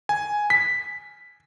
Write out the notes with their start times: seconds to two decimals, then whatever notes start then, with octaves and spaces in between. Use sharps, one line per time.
0.09 G#5
0.50 B6